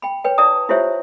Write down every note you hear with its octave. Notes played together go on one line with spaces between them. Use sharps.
G5 B5
B4 C#5 G5
E4 D5 A5 A#5 D#6
E4 F4 G4 C5 C#5 E5